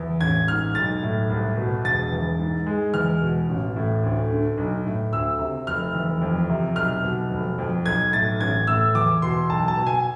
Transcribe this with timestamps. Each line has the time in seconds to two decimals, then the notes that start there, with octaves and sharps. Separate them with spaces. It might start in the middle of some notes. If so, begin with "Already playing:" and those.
Already playing: E2
0.21 A1 G#6
0.48 G#2 F6
0.75 B1 A6
1.03 A2
1.30 C2
1.57 B2
1.84 E1 A6
2.12 E2
2.39 G#2
2.66 G#3
2.94 E2 F6
3.21 B2
3.49 A1
3.76 A2
4.03 D2
4.31 D3
4.58 B1
4.86 A2
5.13 D2 E6
5.39 C3
5.67 F1 F6
5.94 E2
6.22 F2
6.50 C3
6.76 B1 F6
7.03 B2
7.31 F1
7.58 F2
7.85 B1 G#6
8.13 A2 A6
8.40 A1 G#6
8.67 A2 E6
8.95 E2 D6
9.22 B2 C6
9.50 B1 A5
9.68 A5
9.77 B2
9.86 G#5